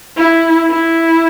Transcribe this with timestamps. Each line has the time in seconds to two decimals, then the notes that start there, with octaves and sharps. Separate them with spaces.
0.17 E4
0.70 E4